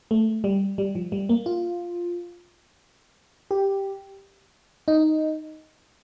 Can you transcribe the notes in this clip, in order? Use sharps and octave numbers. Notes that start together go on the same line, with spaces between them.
A3
G3
G3
F3
G3
A#3
F4
G4
D#4